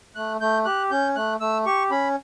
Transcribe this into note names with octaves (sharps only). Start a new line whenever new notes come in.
A3 F#6
A3 G6
G4 F#6
C#4 G6
A3 F#6
A3 E6
G4 C#6
C#4 B5